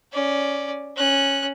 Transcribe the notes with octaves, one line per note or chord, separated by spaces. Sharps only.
C#4 D5
C#4 F#6